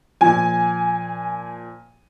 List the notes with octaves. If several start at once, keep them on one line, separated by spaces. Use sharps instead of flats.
A#2 F3 G#5